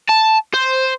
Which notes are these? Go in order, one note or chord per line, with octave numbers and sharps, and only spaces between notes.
A5
C5